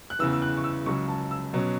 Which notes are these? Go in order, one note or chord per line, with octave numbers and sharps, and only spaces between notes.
F#6
E2 C#3 E3 E6
E6
F#6
C#6
E6
C#2 C#3 F#3 C#6
A5
E6
B2 F#3 C#4